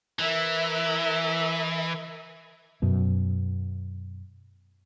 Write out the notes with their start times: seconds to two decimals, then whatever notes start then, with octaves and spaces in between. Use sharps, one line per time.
0.19 E3 A#4 E5
2.82 F#2 B2